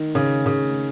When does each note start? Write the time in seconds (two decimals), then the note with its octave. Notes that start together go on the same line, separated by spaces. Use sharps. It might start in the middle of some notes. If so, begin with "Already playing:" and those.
Already playing: D#3
0.15 C#3
0.46 C#3